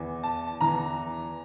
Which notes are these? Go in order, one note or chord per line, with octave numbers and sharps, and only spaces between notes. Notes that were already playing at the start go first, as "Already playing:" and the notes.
Already playing: E2 E3
A5
E2 E3 A#5